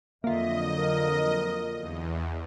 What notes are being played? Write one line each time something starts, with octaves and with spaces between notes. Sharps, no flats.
F2 D3 F#3 A#3 F4 D#5 E5
A#4
E2